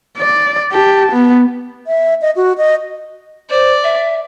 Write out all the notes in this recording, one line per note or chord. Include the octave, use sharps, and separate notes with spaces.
D5
G4 A5
B3
E5
D#5
F#4
D#5
C5 D5
E5